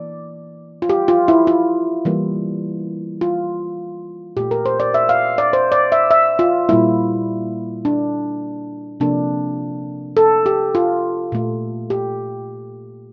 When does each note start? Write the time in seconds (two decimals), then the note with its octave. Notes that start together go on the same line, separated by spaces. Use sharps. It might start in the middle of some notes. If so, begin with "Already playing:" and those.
Already playing: E3 A#3 D5
0.82 F4
0.89 G4
1.08 F4
1.28 E4
1.47 F4
2.05 E3 G3 A#3
3.21 F4
4.37 A#2 A3 G4
4.51 A#4
4.66 C5
4.80 D5
4.94 E5
5.09 F5
5.38 D5
5.53 C5
5.72 D5
5.92 E5
6.11 E5
6.39 F4
6.69 A#2 G3 A#3 E4
7.85 D4
9.00 C3 F3 A#3 D4
10.17 A4
10.46 G4
10.75 F4
11.32 A#2 A3
11.90 G4